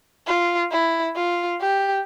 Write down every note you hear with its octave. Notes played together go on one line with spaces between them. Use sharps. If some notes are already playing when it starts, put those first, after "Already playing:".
F4
E4
F4
G4